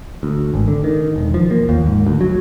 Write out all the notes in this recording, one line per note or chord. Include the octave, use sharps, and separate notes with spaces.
D2
G#1
D3
D#3
E1
F3
A#3
D#2
G#2
D2
F#3